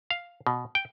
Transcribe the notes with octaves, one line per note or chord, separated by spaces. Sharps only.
F5
B2
G5